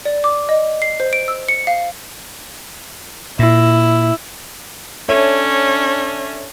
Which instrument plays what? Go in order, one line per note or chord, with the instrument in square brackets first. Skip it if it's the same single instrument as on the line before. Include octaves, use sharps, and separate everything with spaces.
[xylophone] D5
D6
D#5
C7
C5
D7
E6
C#7
F5
[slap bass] A#2 [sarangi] E4
[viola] C#4 D4 [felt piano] A4 C#5 E5